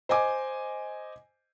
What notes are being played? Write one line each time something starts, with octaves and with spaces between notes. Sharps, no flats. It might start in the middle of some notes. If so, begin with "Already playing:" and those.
C5 D#5 G#5 D6